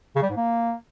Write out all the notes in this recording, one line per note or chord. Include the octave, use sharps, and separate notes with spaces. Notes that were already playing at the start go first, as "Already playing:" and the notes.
C#3
G3
G#2
A#3